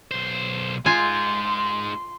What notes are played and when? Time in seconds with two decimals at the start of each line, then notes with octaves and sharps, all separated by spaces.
0.11 B1 C5
0.86 G#3 D#4 F4 G#5 C6